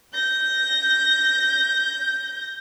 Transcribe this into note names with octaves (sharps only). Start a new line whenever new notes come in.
G6 A#6